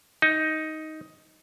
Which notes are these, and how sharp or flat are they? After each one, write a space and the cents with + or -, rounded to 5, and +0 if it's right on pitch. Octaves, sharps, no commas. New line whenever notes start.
D#4 +10